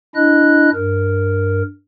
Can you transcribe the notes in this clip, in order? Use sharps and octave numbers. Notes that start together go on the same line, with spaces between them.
D4 E4 D#5 F#6
G2 A#4